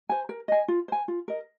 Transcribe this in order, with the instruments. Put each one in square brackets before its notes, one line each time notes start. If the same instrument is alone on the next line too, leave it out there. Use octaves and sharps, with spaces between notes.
[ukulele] C5 G#5
A#4
D#5 G#5
F4
C5 G#5
F4
A#4 D#5